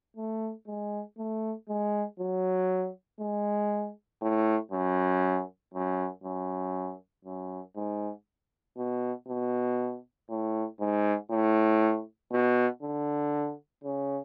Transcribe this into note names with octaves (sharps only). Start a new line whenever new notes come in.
A3
G#3
A3
G#3
F#3
G#3
A2
F#2
F#2
F#2
F#2
G#2
B2
B2
A2
G#2
A2
B2
D3
C#3